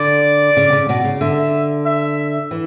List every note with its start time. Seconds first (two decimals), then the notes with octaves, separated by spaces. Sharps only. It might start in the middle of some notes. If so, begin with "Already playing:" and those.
Already playing: D3 D5
0.57 C#3
0.72 C#3
0.89 B2
1.04 C#3
1.21 D3 E5
1.86 E5
2.51 E3